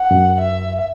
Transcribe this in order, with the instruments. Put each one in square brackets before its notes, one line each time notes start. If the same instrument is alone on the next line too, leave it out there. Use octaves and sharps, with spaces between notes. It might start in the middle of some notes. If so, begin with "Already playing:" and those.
Already playing: [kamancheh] F#5
[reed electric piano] F#2
[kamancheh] E5